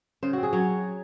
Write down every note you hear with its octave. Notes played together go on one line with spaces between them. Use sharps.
C#3 C5
C4 F#4
G#4
F#3 C#5